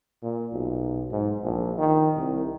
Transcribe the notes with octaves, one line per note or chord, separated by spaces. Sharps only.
A#2
B1
G#2
A#1
D#3
C2